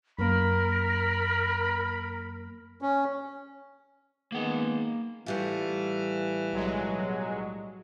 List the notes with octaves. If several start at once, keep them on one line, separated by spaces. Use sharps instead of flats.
F#2 A#3 A#4 B5
C#4
D#3 G#3 A#3 B3 F#5
A2 E3 G3 F4
B1 F#3 G#3